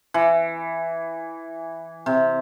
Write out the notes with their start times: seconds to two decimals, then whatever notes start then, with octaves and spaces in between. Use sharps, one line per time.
0.14 E3
2.06 C3